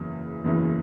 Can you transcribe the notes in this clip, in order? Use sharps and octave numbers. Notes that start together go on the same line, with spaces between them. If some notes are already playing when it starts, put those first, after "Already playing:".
Already playing: F#1 E2 C#3 E3
F#1 E2 C#3 E3